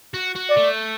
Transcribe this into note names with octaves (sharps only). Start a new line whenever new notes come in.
F#4
F#4
D5
A3